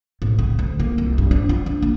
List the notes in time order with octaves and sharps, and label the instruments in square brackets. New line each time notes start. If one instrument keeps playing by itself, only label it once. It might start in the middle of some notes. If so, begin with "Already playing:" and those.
[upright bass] A2
C#3
D2
A#3
C2
G2
D4
F4
D4
A#3